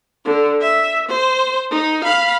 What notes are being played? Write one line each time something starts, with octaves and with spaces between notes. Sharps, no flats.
D3
E5
C5
D#4
F5 B5